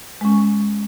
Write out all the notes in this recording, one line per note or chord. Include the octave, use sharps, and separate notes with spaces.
G#3 C#4